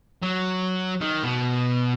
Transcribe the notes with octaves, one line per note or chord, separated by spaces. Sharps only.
F#3
D#3
B2